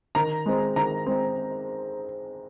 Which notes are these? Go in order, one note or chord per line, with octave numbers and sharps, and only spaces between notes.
D#3 A#5
G#3 C4
D#3 A#5
G#3 C4